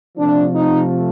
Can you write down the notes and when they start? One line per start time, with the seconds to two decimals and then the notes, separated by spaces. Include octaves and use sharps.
0.18 C3 F3 A3 D4
0.54 D#4